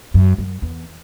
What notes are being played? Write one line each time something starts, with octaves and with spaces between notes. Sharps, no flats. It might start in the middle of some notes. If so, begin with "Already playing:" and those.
F#2
F#2
E2